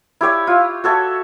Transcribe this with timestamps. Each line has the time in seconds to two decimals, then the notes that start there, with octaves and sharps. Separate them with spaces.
0.21 E4 G4 C#5 D5
0.47 F4
0.84 F#4 A4 C#5 E5